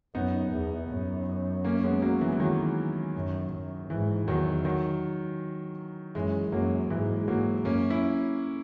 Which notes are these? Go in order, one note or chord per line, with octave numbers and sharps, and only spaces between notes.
F#2 B3 D#4
E2
F#2
A#3 C#4
G#3 B3
F#3 A#3
E3 G#3
E3
D#3 F#3
F#2
F#2
G#2 E3
E2 D#3 F#3
D#3 F#3
F#2 E3 G#3
F#2 F#3 A#3
G#2 E3 G#3
G#2 F#3 A#3
F#2 A#3 C#4
C#4 E4